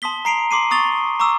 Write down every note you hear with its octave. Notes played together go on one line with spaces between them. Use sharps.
A5 C6 D#6 B6 G7
A#5 C7 D7 F7
C6 D6 C7 D#7
C#6 D#6 A6 F7 G7
A#5 C#6 D6 E6 E7